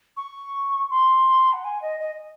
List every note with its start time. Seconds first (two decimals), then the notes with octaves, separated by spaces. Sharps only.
0.16 C#6
0.90 C6
1.53 F#5
1.64 G#5
1.82 D#5
2.00 D#5